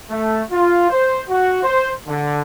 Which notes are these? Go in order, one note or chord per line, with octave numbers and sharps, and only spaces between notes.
A3
F4
C5
F#4
C5
D3